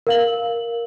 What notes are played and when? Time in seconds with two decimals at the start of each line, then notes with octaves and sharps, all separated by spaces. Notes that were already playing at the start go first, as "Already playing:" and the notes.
0.07 A#4 F5 F#7